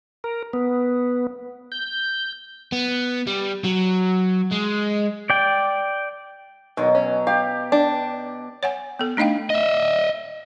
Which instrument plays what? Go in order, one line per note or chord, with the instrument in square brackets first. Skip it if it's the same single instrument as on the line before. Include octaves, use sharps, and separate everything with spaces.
[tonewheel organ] A#4
B3
G6
[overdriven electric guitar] B3
G3
F#3
G#3
[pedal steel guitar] D5 G5
[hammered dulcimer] B2 F#3 [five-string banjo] D#3
[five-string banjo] C#4
[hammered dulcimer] G4 [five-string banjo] F5
[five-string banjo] D4
[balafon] C#5 F#5 G#5
B3 A4
A3 D4 D#4 D#5 F5 G5
[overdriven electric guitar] D#5 E5